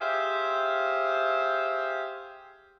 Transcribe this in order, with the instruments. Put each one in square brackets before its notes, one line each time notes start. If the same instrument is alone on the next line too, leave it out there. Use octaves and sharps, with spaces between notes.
[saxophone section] G4 G#4 C5 E5 F5